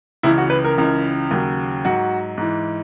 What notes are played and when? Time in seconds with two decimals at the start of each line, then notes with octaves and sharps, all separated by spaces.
0.23 C#2 C#3 E3 E4
0.38 F#4
0.50 B4
0.64 A#4
0.77 C#2 C#3 E3
1.31 D#2 C#3 F#3
1.85 G#2 F#3 F#4
2.38 G#2 E3